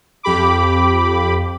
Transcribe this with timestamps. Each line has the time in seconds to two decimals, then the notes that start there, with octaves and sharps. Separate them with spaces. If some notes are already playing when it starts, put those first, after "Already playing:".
0.23 F2 G4 B5 D6